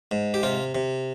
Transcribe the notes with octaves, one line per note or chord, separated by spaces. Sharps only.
G#2
G4
C3 F4
C3